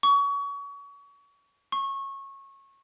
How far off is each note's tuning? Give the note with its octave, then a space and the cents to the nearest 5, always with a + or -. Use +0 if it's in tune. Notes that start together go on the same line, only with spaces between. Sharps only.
C#6 +30
C#6 -20